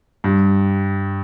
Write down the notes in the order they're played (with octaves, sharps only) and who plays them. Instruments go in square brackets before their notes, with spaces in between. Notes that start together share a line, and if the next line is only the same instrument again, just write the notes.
[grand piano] G2